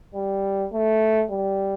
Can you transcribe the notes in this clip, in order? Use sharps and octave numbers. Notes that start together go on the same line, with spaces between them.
G3
A3
G3